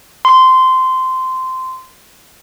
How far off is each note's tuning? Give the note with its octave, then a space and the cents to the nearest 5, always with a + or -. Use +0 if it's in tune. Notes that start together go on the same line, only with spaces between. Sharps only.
C6 -15